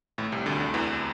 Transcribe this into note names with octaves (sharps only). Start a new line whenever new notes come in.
A1 A2
C2 C3
D2 D3
D2 D3
E2 E3